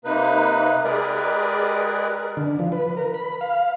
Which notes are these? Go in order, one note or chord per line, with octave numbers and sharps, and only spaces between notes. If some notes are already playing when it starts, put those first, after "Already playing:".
C3 A#3 D#4 B4
G#3 G4 G#4 A#4 B4 D5
D3
F3
B4
A#4
B5
F5